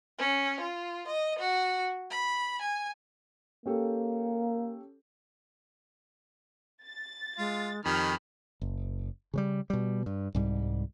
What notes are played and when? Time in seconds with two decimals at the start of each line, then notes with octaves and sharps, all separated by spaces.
0.19 C#4
0.60 F4
1.07 D#5
1.39 F#4
2.11 B5
2.62 G#5
3.66 A#3 C#4 G4 A4
6.85 A6
7.38 G#3 F4
7.85 F2 D#3 G4 B5 F6 F#6
8.61 F#1
9.34 C#3 F#3 G3
9.70 B2 G3
10.06 G2
10.35 C2 G#2 G3